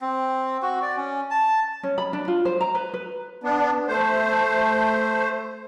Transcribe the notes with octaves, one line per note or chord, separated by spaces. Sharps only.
C4
F#4
D5
C#4
A5
C#4
B5
D4
F4
C5
A#5
B4
B4
B3 D4
A3 C5